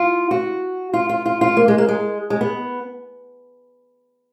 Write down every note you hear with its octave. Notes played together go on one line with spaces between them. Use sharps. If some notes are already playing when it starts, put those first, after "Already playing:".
Already playing: F4
F#4
F4
F4
F4
F4
A#3
G#3
A#3
G#3
G#3
B3